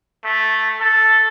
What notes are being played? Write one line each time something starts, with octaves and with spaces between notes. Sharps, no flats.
A3
A4